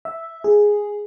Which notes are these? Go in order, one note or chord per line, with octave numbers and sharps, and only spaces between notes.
E5
G#4